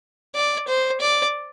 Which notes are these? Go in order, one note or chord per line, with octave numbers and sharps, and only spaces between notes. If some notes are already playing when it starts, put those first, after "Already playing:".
D5
C5
D5